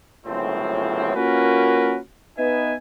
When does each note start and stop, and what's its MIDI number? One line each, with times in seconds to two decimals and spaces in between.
0.26 1.15 31
0.26 1.15 37
0.26 1.15 42
0.26 1.15 45
0.26 1.15 60
1.15 1.98 58
1.15 1.98 61
1.15 1.98 65
1.15 1.98 66
1.15 1.98 70
1.15 1.98 71
2.37 2.74 59
2.37 2.74 63
2.37 2.74 71
2.37 2.74 75
2.37 2.74 76
2.37 2.74 80